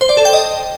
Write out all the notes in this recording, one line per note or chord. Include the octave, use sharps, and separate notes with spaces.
C5
D5
A4
G5
D#5